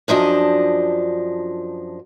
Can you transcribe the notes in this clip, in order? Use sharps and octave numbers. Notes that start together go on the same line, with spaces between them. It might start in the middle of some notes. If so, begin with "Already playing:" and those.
F#2 F3 D4 D#5